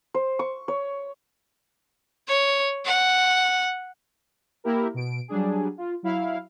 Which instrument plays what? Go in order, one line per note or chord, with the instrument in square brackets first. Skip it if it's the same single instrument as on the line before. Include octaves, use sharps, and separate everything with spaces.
[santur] C5
C#6
C#5
[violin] C#5
F#5
[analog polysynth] A#3 E4 G4 A#4
B2 D7
F#3 G3 D4 G#4
F4
F#3 E4 F5